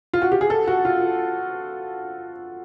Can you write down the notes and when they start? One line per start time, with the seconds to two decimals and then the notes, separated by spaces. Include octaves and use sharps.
0.13 F4
0.22 F#4
0.32 G4
0.41 G#4
0.50 A4
0.67 F#4
0.85 F4